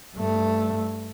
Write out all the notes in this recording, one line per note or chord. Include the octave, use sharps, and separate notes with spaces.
G2 A3